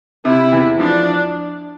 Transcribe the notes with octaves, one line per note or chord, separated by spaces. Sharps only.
C3 E4
E2
F3 D4